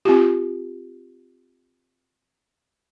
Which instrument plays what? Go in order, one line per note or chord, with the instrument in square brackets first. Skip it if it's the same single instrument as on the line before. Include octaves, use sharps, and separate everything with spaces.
[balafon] C4 F4 G4